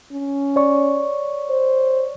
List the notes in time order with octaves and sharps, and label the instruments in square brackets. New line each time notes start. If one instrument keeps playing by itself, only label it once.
[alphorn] C#4
[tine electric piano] C#5 D5 C#6
[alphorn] C5